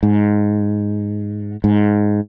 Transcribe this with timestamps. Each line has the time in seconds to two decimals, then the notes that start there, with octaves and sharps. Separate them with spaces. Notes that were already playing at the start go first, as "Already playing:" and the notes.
0.03 G#2
1.64 G#2